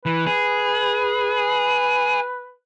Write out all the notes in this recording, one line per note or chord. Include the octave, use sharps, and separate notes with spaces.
E3 B4
G#4